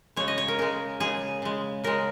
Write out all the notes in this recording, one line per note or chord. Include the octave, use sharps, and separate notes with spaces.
C#3 G#3 C#5
D#5
C#5
A#4
C#3 G#3 A#4
C#3 G#3 G#4
C#3 G#3
C#3 G#3 A#4